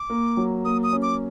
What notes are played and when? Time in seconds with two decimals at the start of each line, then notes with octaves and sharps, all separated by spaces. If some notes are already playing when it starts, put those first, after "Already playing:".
Already playing: D6
0.10 A#3
0.37 F#3
0.65 A#3 D#6
0.83 D#6
0.93 C#4
1.02 D6